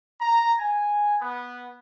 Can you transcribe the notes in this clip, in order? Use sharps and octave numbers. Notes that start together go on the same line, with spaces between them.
A#5
G#5
B3